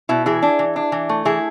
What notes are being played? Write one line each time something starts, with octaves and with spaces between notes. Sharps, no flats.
B2 E4
E3 E4 G#4
D4
E3
D4
E3
A3
E3 E4 G#4